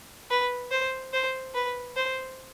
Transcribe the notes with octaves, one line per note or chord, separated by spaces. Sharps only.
B4
C5
C5
B4
C5